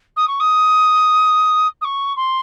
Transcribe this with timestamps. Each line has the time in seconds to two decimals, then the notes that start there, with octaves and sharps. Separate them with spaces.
0.16 D#6
0.28 C#6
0.40 D#6
1.81 D#6
1.84 C#6
2.16 C6